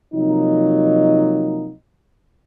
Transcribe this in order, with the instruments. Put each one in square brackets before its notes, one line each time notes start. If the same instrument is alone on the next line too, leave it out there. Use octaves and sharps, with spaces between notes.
[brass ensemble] C3 F3 F#3 A#3 D#4